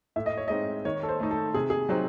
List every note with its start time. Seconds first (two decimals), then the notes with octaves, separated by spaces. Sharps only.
0.16 A2 E5
0.26 D#5
0.37 C#5
0.48 G#3 C4 D#4 D#5
0.85 D#3 C#5
1.03 A4
1.09 C5
1.20 A3 D#4
1.31 A4
1.54 C3 G#4
1.70 G#4
1.89 F#3 C4 D#4